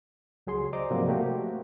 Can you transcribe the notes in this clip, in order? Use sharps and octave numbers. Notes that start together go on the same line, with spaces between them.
C#2 F#3 G#4 C6
C5 D5 D#5 A#5 D6
G#2 C3 F3 F#3 A#3 C4
A3 A#3 F#4 G4